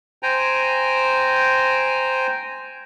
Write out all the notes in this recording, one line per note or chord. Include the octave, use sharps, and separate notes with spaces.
C5 G5 G#5 A#5